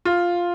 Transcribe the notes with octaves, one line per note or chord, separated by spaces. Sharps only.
F4